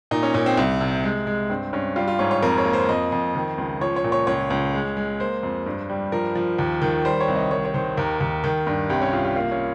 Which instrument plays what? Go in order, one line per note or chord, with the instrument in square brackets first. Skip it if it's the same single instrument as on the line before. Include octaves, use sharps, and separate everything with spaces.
[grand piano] A#2 D#4
C#4
A#2 C#4
C4
C2
C3
G#3
G#3
G2 C4
G2 C#4
G3 F4
F4
G#2 C#5
C#5
F2 A#4
C#5
A#3
C5
F2 D#5
F2
D#3
C#2
F3 C#5
C#5
A#2
C#5
C#2 C#5
C#2
G#3
G#3
A#3 C5
F2
G2
G3
F3 A#4
F3
D#2
D#3
G3 C5
C#5
C2
D#5
D#3 C#5
C#5
D#3 C5
D#2 A#4
D#2
D#3
G2
C2 G4
C#4
C2 F4
G4
A#3 F4
C#4